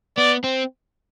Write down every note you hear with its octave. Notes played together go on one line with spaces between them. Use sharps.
B3 D5
C4